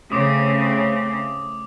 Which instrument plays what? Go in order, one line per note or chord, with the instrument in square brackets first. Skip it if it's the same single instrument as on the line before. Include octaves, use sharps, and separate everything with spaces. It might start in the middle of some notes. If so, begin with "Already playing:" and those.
[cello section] C#3 A3 C4 [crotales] D6 D#6